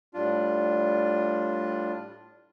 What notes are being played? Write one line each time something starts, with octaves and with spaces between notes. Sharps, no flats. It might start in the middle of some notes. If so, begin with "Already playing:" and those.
A2 G3 D4 F4